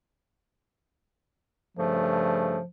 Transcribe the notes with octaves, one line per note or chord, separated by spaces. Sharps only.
G2 C#3 F3 A3